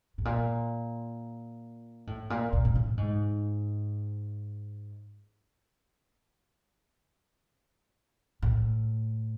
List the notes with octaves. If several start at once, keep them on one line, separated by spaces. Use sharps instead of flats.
A2
A#2
A2
A#2
A#2
A#2
A2
G#2
A2